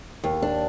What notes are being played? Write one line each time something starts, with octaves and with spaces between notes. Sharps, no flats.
D#2
D4